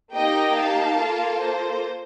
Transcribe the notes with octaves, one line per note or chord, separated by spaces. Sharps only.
A#3 D#4 G4 D#5 G5
F5 A5
A#3 F4 A4
C5